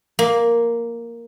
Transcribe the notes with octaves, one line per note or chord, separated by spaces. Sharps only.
A#3